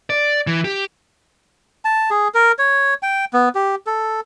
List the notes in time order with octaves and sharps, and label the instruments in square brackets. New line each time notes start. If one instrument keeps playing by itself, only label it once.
[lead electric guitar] D5
E3
G4
[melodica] A5
G#4
A#4
C#5
G5
B3
G4
A4